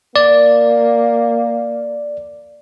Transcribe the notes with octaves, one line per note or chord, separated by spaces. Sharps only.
A#3 D5